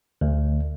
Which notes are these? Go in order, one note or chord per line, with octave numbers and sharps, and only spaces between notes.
D2